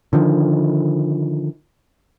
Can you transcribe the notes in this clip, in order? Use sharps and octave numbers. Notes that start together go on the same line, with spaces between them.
D3 D#3 F3